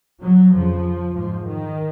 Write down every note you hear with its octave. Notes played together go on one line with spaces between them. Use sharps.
F#3
F2 C#3 F3
G#2 F3
D#3